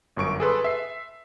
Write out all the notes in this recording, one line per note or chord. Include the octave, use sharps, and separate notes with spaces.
G1 F#2 C#6 D7
G#4 A4 B4 C6
E5 C7